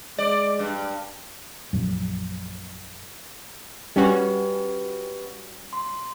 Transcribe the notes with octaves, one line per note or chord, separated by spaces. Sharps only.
G#3 D5
G2
A#1 F#2
G3 C#4 F#4 G4 B4
C6